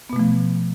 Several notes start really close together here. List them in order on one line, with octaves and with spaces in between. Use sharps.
B3 B2 A3 F3